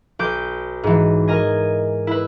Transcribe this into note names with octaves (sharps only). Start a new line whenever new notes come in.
B1 D6 G6 D7
G#2 E3
A#4 D#5 G#5
E4 B4